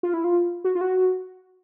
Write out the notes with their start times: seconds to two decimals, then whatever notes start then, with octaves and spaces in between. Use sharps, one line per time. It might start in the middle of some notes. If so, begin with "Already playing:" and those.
0.03 F4
0.14 E4
0.24 F4
0.64 F#4
0.75 F4
0.81 F#4